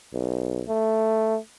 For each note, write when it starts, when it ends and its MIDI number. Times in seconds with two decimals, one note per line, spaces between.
0.13 0.62 35
0.68 1.37 57